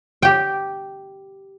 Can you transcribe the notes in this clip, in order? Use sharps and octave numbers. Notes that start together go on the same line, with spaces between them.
G4 G5